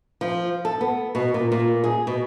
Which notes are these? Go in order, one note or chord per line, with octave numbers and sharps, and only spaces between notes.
F3
A4
B3
B2
A#2
A#2
G#4
B2